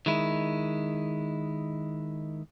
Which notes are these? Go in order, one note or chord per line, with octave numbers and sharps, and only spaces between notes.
D#3 G#3 E4